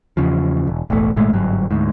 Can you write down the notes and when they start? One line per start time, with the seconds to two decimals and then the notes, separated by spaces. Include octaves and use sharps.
0.17 E2 C#3 F3
0.67 E1
0.90 E1 A1 E2 A3
1.16 G#1 A#2 G#3 A3
1.33 G1 G#2 F#3
1.71 D2 G#2